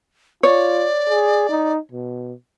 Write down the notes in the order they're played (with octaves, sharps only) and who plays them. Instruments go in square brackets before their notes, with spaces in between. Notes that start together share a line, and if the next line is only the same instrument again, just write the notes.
[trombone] F4 [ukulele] C#5 [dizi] D5
[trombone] G#4
D#4
B2